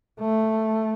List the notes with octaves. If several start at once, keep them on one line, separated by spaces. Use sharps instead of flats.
A3